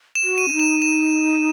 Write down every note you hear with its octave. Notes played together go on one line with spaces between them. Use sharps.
E7
F#4
D#7
C#4
D#4
E7
E7